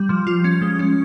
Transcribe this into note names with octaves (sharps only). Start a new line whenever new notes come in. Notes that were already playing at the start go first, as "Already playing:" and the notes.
Already playing: G3
F3
F4
C#4
G#3
C#4